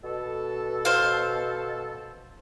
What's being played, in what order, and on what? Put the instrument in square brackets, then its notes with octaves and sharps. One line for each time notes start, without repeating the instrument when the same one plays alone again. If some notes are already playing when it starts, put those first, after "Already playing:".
[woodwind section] B2 A4
[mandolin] C5 F5